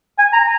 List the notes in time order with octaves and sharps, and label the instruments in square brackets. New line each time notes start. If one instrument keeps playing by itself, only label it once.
[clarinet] G#5
A#5